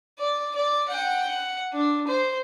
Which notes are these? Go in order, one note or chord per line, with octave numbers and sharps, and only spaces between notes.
D5
D5
F#5 G5
F#5
D4
C5